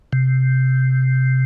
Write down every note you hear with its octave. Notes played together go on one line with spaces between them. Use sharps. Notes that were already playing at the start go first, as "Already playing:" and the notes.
C3